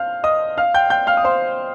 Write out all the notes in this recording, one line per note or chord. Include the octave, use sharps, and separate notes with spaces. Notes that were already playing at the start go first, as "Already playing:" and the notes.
Already playing: F5 F6 G6
D#5 D#6
F5 F6
G5 G6
G5 G6
F5 F6
D#6
C5 C6